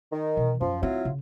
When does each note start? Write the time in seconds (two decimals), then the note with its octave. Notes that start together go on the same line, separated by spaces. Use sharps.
0.12 D#3
0.37 B2 E3
0.61 F#2 F3
0.83 F#3 C4 E4 F4
1.05 C#3